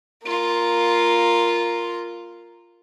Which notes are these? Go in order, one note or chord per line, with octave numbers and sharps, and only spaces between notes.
A#3 F4